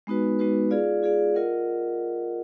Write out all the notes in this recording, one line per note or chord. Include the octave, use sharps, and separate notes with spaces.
G#3 B3 D#4 F#4 B4
G#3 B3 D#4 F#4 B4
F4 G#4 D5 F5
F4 G#4 D5 F5
F4 A#4 D#5 F#5